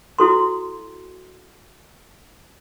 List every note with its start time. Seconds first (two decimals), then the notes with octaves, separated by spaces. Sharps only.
0.19 E4 F#4 A4 C6